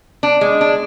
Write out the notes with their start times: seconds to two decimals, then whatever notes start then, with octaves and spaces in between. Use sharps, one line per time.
0.23 D4
0.41 G#3
0.61 D4